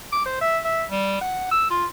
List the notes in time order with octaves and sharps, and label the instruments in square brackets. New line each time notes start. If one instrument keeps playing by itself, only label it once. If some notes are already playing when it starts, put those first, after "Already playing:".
[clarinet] D6
C5
E5
E5
G3
F#5
E6
F4